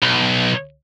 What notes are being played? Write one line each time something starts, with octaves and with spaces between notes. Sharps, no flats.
B1